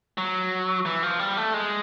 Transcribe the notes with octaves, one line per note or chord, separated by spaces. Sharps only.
F#3
E3
F3
G3
A3
G#3